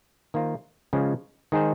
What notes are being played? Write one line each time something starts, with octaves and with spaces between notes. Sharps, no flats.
D#3 A#3 F4 C5
C#3 F3 G#3
D#3 G#3 D#4 G#4 C5